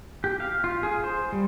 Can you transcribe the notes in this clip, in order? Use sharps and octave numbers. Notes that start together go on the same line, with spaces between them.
G4
F5
F4
G#4
C5
G3